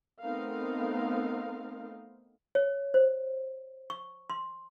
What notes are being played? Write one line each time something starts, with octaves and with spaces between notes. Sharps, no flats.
A3 B3 C4 D#4 A#4 F5
C#5
C5
C#6
C6